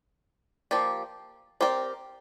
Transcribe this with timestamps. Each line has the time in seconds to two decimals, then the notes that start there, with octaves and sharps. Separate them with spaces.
0.71 F3 A#3 G4 D5
1.61 C4 G4 A#4 D5